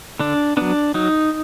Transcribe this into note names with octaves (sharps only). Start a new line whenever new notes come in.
D3 D4
F#3 B3 D4
F#3 D#4